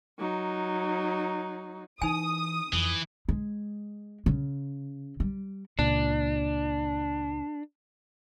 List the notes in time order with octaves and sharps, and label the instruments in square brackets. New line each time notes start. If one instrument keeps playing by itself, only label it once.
[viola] F#3 D#4
[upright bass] E3 [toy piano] D#4 G#5 [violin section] D#6
[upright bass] F2 [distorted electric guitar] E3
[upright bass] G#3
C#3
G3
[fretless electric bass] C#2 A#2 [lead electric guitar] D4